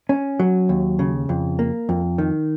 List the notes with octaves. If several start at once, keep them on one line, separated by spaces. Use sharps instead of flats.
C#4
F#3
D#2
C#3
F2
A#3
F2
D#3